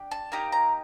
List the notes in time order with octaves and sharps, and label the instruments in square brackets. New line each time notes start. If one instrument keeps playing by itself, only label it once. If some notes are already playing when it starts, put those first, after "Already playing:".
Already playing: [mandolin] D4 G4
A5
A#3 D#4 G4 A#5
A#5